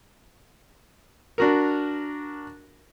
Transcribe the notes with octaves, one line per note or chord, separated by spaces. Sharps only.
D4 F#4 A#4